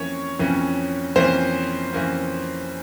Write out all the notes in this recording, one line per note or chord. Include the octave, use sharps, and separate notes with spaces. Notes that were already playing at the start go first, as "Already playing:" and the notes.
Already playing: F2 E3 A#3 C#4 C#5
F2 E3 A#3 C#4
F2 E3 A#3 C#4 C5
F2 E3 A#3 C#4